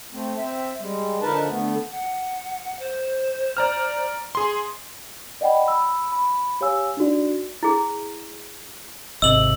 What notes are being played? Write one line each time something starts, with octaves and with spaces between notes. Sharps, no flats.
A3 C4
C4 E5
G3 G#3
D3 F3 D#4 A#4 B4 A5
D3 A3 B3
F#5
C5
D5 A#5 F6
G#4 C6
D5 D#5 F#5 G5 B5
B5 E6
B5
G4 C#5 F5 G#5 E6
D4 D#4 F#4 D5
E4 G#4
G#1 C3 D#5 E6 F#7